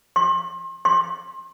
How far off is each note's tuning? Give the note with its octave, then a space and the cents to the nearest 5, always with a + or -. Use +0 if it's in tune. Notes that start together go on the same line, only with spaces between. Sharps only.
C6 +35
C6 +30